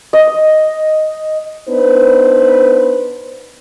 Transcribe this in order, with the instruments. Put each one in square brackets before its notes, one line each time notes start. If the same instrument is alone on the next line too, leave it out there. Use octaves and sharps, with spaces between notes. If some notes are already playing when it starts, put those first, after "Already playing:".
[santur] D#5
[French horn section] B3 D4 D#4 B4 C5